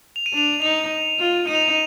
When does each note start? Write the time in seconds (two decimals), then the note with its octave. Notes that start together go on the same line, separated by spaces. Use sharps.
0.16 F7
0.26 D#7
0.33 D4 F7
0.62 D#4 F7
1.19 F4
1.47 D#4 D#7
1.55 F7
1.62 D#7